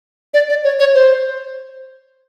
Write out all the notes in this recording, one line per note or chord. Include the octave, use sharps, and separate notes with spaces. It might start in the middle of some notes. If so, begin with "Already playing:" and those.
D5
D5
C#5
C#5
C5